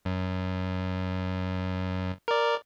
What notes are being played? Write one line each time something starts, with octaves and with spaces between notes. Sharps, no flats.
F#2
A#4 D5